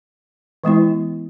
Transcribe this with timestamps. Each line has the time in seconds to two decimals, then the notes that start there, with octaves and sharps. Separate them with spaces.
0.64 E3 G#3 B3 E4